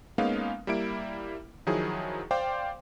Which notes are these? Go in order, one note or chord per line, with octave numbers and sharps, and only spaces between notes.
G#3 A#3 B3 C#4 D#4 F5
G3 A#3 E4 D7
D#3 F3 F#3 D#4 E4 G#4
C5 D5 F5 G5 C6 D6